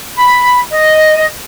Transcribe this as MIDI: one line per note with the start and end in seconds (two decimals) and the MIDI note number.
0.16 0.58 83
0.69 1.24 75